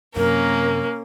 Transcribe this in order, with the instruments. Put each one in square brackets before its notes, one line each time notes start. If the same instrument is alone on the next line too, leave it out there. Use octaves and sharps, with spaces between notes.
[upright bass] F#2 C3 [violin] A#3 C#4 [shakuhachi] A#4